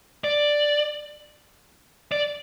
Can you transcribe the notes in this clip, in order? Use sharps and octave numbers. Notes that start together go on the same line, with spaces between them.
D5
D5